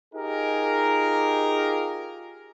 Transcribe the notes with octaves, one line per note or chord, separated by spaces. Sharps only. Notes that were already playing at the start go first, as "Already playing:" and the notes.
D#4 F4 G4 G#4 A#4